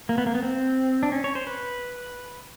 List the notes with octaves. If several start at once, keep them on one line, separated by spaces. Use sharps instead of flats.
A#3
B3
A#3
B3
C4
D4
C#4
C#5
C5
B4